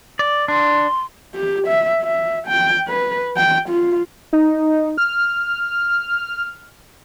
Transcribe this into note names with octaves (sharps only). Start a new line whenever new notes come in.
D5
D4 C6
G4
E5
E5
G5
B4
G5
F4
D#4
F6